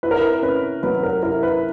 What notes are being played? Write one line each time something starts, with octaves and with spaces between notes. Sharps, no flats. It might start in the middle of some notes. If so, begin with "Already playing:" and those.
E4 B4
A#4
B4
C#4 B4
F#3 B4
A#4
E4 A#4
B4